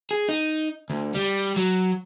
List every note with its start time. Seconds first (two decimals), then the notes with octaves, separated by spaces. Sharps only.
0.11 G#4
0.29 D#4
0.90 D2
1.14 G3
1.56 F#3